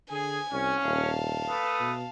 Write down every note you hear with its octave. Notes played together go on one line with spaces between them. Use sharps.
D3 G#4 G#5
C2 C#4
D#1 F5 A5
A3 B4 D#6
B2